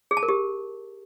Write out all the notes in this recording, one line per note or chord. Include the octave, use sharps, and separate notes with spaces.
G#4
A5
A#4
G4